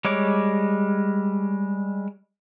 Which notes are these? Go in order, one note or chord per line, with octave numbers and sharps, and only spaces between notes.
G3 G#3 C#5 D6